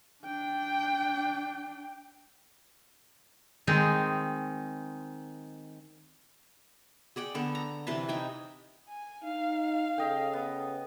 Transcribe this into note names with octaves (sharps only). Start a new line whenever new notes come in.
D4 G5
D#3 G#3 C4 D#4
G#4 D5 F#5 G5
D3 B3 A4
A#5
C3 E3 B4 A5
D#4 G5 G#5
G#5
D#4 F5
C#3 A4 D#5 G5
B3